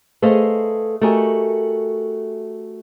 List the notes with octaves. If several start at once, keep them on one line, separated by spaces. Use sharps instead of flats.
A3 G#4 B4 C5 D#5 F5
A3 F#4 G4 A#4 D#5 G#5